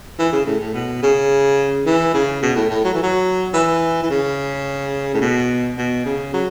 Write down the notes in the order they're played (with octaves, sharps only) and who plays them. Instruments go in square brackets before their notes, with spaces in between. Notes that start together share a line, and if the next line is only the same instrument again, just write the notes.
[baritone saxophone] E3
C#3
A2
A2
B2
C#3
E3
C#3
B2
A2
A2
F#3
E3
F#3
E3
E3
C#3
A2
B2
B2
C#3
F#3